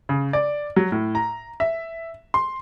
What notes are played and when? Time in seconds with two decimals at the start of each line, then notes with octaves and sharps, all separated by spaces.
0.09 C#3
0.33 D5
0.76 F#3
0.92 A2
1.15 A#5
1.60 E5
2.34 C6